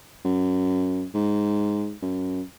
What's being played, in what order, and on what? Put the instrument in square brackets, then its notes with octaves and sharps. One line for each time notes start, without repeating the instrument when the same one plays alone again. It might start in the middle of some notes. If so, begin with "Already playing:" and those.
[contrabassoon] F#2
G#2
F#2